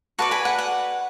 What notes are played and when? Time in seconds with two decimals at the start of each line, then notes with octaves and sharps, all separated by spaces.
0.19 F#4 B4 D5 A5 C#6
0.31 G#5 B5
0.45 F#5
0.59 F#5